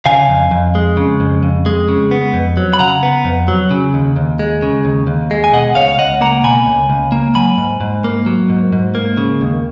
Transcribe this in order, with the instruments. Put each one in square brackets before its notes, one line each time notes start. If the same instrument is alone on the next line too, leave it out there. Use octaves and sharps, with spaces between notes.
[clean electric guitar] C#3 F5 G#5
F2
F2
G#3
C#3
F2
F2
G#3
C#3
B3
F2
F#3
B5
C#3 F#5 A#5
B3
F2
F#3
C#3
D#2
D#2
G#3
C#3
D#2
D#2
G#3
G#5
B2 D#5 F#5
C#2 C#5 F5
F5
C#2 D#5 F#5
A#3 F#5 A#5
B2 G#5 B5
C#2
C#2
A#3
F#3 G#5 B5
G#2
G#2
A#3
F#3
G#2
G#2
A#3
C#3
D#2